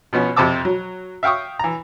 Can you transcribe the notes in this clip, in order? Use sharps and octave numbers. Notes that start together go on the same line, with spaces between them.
B2 F3 B3 C#4
F2 C3 C5 A5 D6 E6
F#3
E5 F5 G5 C#6 D#6
E3 A#5